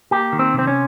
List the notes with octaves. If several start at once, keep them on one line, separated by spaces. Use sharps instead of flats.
A#3 G4
D#3
C4
C3
C4
C#4